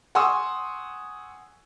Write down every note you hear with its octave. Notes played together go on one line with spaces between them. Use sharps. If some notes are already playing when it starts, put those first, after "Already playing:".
F#5 G#5 C6 C#6 D#6 E6